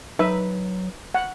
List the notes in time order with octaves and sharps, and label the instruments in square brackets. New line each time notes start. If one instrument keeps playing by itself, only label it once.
[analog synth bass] F#3 [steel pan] D#4 E5 [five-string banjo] B4
[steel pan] F#5